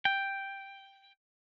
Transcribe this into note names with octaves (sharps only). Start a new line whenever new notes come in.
G5